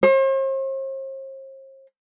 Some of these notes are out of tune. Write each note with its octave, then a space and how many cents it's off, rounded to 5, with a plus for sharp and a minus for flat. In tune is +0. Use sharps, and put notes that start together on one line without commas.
C5 +45